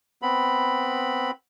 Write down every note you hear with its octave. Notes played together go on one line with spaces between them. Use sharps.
B3 C4 B5